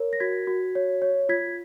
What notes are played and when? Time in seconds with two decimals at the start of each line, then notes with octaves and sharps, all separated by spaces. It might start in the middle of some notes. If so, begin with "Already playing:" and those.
Already playing: A#4 C#5
0.13 A#6
0.20 F#4 G#6 B6
0.47 F#4
0.75 C#5
1.02 C#5
1.29 F4 G#6 B6